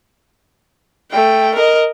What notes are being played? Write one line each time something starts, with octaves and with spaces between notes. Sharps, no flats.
A3 G5
A#4 D#5